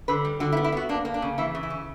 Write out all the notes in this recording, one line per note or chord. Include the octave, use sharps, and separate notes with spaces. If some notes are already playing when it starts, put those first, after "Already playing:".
D3 B4
G3
D3 F#4
E4
B3
E4
B3 F#4
A#3 D4
A#3
D4
C#3
E3 E4
C#3
E4
C#3